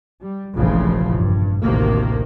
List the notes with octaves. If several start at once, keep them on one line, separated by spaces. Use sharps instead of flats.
G3
F1 A#1 F2 C#3 E3 F3
G2
A1 D2 C3 D#3 A#3